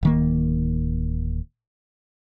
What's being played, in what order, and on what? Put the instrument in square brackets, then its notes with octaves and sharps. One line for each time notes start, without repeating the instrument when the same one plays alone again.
[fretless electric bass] D1 D#3 A#3